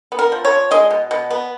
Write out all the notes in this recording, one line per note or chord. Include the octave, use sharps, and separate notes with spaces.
B3
A#4
F3
C#5
F3
G#3 D#5
B2
B2
B3